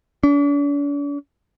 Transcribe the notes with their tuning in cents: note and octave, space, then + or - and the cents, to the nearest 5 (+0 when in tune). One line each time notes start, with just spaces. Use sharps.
D4 -45